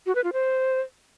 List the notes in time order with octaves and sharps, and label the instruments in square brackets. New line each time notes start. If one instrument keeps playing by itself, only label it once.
[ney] F#4
B4
F4
C5